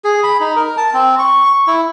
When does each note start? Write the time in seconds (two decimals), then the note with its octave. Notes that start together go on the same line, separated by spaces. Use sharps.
0.04 G#4
0.23 B5
0.40 D#4
0.56 A#4
0.77 A5
0.93 C4
1.19 C#6
1.45 C#6
1.67 E4